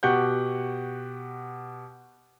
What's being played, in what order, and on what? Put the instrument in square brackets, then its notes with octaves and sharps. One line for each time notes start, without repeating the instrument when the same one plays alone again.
[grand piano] B2 G4 F#5 C#6 F#6 G6